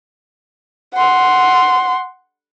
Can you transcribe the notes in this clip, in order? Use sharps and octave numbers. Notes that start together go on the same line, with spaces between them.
F#5 C6